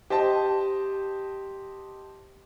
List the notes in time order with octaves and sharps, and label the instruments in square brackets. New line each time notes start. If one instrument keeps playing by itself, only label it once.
[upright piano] G4 C5 D#5 A5